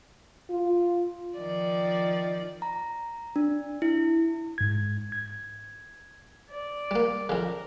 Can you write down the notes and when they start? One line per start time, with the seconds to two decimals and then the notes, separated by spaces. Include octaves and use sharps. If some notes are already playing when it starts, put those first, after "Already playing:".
0.50 F4
1.38 D#3 F3 D5
2.62 A#5
3.36 D4
3.82 E4
4.58 G#2 G#6
5.12 G#6
6.50 D5
6.91 G3 A#3
7.29 F2 C#3 A#4